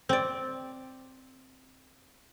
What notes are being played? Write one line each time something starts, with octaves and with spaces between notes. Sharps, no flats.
C4 D5